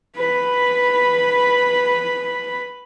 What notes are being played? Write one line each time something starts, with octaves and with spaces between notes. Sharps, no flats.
B4 B5